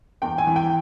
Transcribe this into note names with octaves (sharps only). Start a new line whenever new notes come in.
E2 G5
G#5
E3
G5